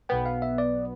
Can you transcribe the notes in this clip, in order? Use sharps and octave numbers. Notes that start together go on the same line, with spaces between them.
B1 B2 B3 G5
F5
E5
D5